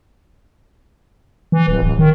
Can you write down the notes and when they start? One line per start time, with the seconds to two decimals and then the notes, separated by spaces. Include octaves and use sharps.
1.52 E3
1.68 D1
1.83 D1
1.99 D#3